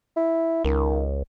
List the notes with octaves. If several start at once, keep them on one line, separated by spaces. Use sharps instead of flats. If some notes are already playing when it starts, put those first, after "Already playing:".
E4
C#2 D#3